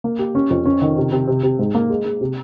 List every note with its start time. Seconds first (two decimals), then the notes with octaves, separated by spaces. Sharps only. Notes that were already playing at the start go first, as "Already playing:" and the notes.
0.04 A#3
0.19 G4
0.35 C#4
0.50 F2
0.65 C#4
0.82 D#3
0.97 C3
1.12 C3
1.27 C3
1.43 C3
1.59 G#2
1.75 A#3
1.90 G#3
2.05 G#3
2.21 C3